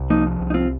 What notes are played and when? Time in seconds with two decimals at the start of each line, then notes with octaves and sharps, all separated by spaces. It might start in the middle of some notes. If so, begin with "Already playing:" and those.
Already playing: C2
0.10 F3 A#3 D#4
0.40 C2
0.50 D#4
0.54 C4 F4